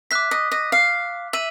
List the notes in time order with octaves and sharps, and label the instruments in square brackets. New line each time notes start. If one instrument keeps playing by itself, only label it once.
[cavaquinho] E5 [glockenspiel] D6 F#6 B6
[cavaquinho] D#5
D#5
F5
[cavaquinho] E5 [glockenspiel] D#7 F#7